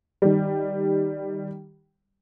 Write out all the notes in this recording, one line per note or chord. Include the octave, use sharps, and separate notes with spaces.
D#3 G3